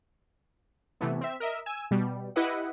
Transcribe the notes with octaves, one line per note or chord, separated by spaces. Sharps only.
C3 E3 A3 B3
C4 E5
A#4 D#5 E5
G#5 E6
B2 G3
E4 G4 B4 D#5 F#5